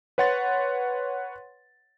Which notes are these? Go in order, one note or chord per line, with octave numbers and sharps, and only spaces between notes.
B4 C#5 F#5 C6 A6